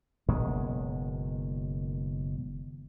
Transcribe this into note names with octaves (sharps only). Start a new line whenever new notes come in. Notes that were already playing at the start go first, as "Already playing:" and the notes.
F#1 B2 D#3 G#3